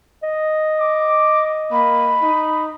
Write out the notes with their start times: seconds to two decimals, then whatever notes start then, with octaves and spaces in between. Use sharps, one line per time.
0.23 D#5
0.80 D6
1.71 A#3 B5
2.22 D#4